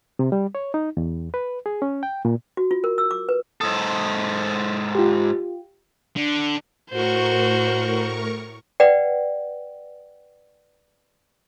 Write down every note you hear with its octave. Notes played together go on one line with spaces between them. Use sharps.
C3
G3
C#5
D#4
E2
B4
G#4
C#4
G5
A#2
F#4
F4
A#4
E6
D6
B4
G#2 A4 D#6
F4 G4
D3
A2 F#4 A#4 C5 C#6
B4 D5 F#5 G5